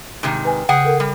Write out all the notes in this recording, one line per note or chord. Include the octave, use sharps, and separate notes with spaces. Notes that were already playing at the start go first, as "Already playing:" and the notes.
G#2 C3 D#3
B4 G#5
C#3 G#4 F#5 G5
A4 A#4
G3